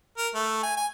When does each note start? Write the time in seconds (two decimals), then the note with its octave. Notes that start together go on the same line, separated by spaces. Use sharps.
0.18 A#4
0.35 A3
0.63 G#5
0.77 G#5